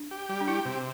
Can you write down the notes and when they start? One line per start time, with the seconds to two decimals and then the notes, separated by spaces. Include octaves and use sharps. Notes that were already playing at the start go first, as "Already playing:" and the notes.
Already playing: D4
0.11 G4
0.29 G3
0.41 D4
0.47 E4 G4
0.65 C3